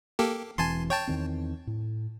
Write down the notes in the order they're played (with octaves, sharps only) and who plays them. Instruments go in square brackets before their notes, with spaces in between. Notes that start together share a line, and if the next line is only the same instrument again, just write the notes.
[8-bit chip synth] A#3 G4 A4
[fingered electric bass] E1 E3 C4 [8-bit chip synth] G#5 A5 C6
[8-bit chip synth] C#5 G5 A5
[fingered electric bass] E2 D#3 C4
A2